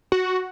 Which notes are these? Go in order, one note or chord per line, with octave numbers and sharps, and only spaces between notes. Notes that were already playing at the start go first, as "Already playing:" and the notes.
F#4